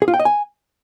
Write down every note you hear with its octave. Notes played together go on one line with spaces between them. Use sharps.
G#4
F4
G5
D#5
G#5